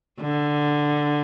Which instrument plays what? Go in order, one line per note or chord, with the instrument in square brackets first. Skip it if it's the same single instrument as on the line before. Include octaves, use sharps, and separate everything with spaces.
[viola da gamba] D3